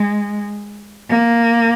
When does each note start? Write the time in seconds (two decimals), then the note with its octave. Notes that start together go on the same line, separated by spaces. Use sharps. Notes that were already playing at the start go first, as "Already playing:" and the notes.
Already playing: G#3
1.10 A#3